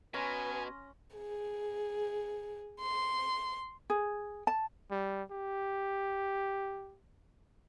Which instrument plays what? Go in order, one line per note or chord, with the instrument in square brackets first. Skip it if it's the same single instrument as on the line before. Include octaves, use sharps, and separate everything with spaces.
[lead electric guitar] B2 [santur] C#4 A#5 C6 [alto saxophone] B4 [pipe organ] G#5
[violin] G#4
C6
[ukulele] G#4
A5
[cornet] G3
G4